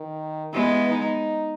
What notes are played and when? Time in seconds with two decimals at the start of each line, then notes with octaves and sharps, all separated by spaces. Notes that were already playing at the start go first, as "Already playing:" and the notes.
Already playing: D#3
0.53 E3 G#3 B3
0.90 D#4